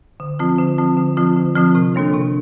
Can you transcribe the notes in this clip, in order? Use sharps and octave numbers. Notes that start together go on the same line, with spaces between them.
D3
F3 C4 F4
D3
F3 C4 F4
D3
F3 C4 F4
D3
F3 C4 F4
C3
D#3 A#3 D4 A4
C3